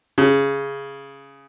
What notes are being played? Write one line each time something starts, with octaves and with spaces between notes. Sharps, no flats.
C#3